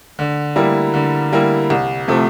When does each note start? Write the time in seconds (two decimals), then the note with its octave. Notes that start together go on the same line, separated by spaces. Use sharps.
0.19 D3
0.56 G3 A#3 E4
0.94 D3
1.32 G3 A#3 E4
1.70 C2
2.08 C3 F3 A3